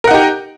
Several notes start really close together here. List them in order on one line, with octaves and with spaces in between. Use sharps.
A#4 F#5 D#4 G4